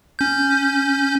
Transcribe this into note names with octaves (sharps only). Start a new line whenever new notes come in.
C#4 G6